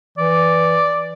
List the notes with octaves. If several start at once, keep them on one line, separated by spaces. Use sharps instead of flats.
E3 D5